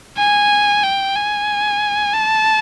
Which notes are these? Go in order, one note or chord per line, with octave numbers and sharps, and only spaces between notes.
G#5
G5
G#5
A5